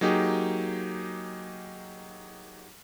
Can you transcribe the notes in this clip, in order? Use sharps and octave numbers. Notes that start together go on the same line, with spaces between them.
F#3 A#3 D#4 G4 G#4